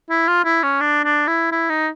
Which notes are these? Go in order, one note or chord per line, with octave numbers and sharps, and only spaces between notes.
E4
F4
E4
C#4
D4
D4
E4
E4
D#4